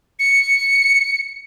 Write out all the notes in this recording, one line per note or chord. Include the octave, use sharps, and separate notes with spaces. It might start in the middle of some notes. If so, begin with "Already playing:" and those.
C#7